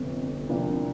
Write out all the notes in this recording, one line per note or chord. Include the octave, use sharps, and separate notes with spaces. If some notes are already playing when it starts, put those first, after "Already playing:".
Already playing: G1 F2 C3
C2 C3 F3 A#3 D4